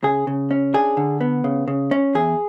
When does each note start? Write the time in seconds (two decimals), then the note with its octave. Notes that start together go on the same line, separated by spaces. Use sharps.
0.03 C#3 G#4
0.27 C#3
0.51 C#4
0.74 D4 G#4
0.97 D3
1.21 B3
1.44 C#3
1.68 C#3
1.91 C#4
2.15 E2 G#4